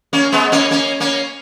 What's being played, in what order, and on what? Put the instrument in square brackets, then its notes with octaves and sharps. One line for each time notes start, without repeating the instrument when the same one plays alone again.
[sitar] A#3 C#4
G#3 B3
A#3 C#4
A#3 C#4
A#3 C#4